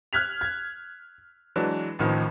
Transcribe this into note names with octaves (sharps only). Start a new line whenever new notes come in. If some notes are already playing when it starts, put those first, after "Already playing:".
F6 F#6 G#6 B6 F7
G#6
E3 F#3 G#3 D4
A1 A2 D#3 F3